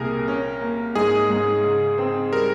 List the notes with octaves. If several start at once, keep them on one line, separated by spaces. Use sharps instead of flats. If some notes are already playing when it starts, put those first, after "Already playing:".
Already playing: C2 A#2 G#4 A#4
C#4
A#3
G#2 G#4
G#2
C#3
C4
G3 A#4